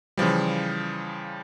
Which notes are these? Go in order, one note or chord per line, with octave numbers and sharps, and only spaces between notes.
C#3 E3 F3 G3